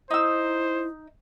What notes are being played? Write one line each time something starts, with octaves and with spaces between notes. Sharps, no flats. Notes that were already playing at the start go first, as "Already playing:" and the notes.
D#4 E4 C5 E6